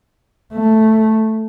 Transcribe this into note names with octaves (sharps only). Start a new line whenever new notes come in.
A3